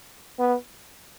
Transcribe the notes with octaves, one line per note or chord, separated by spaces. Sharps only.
B3